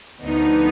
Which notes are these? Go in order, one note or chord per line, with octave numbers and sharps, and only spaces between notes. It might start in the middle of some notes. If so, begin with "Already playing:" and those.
D2 D3 F3 B3 D#4